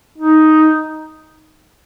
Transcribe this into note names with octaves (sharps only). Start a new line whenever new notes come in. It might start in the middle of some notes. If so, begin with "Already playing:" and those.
D#4